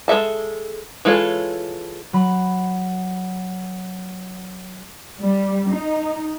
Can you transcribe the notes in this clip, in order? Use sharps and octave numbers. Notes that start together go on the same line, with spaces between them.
G#3 A4 E5 A5
E3 G#3 F4 A4 C#5
F#3 B5
G3
D#4